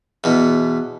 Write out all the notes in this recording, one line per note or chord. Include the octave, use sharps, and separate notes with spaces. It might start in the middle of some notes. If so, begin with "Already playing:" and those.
E2 B2